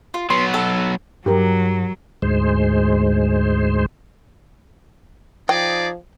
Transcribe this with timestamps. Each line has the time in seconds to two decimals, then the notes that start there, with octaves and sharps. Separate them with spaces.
0.14 F4
0.30 F#3 B3 C6
0.53 A4 A5
1.26 G2 F#3 G4 A#4
2.22 D2 G#2 G#3 C5
5.49 F3 D#4 G#4 D5 G5